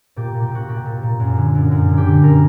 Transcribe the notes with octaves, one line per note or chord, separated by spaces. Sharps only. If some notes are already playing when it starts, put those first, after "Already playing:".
A#2 G4
A#2
G4
A#2 F#4
A#2 G4
A#2
A#2
F#2
D3
F#2
F#2
D3
G4
D3
F#2 A#4